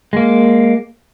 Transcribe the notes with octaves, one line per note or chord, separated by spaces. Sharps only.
G#3 A#3